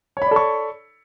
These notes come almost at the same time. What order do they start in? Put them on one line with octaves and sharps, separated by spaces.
C#5 B5 D5 A4 C#6